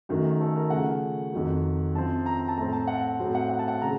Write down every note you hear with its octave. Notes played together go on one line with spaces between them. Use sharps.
F#2 D#3 A3 F#4
A4
A#4
C#3 F3 A3 F#5
F2 D#3 F#3
F#2 F3 C4 A5
A#5
A5
A2 A3 C4 A#5
A5
F#5
A2 F#3 C4
F#5
F#5
A5
F#5
C#3 A3 A#5